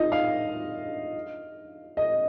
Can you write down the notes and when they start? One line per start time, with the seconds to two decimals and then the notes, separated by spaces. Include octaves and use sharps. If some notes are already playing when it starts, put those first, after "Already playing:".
Already playing: D#4 F4 D#5
0.12 F5
1.97 D#5